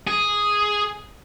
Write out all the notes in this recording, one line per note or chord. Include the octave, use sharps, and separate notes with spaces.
G#4